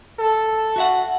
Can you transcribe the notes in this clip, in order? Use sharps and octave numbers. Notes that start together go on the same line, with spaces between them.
A4
F#4 E5 F#5